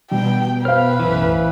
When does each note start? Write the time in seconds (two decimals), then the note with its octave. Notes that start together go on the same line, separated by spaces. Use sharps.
0.11 B2 G3 B3 G5
0.65 B4 C5 F5 F6
1.00 B1 F#2 A2 E3